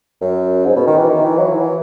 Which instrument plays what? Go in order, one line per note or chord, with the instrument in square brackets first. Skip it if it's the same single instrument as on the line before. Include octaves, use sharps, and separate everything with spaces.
[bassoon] F#2
G#2
B2
D#3
E3
D#3
E3
F#3
E3